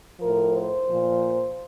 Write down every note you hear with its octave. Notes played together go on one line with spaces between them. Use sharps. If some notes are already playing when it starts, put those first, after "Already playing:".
A2 F3 A#4
C5
A#2 F3